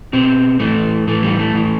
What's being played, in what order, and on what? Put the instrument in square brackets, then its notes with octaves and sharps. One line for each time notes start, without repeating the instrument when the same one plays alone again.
[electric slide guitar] B2 C4
A2 E3 A3
A2 E3 A3
G3
A3
A2 E3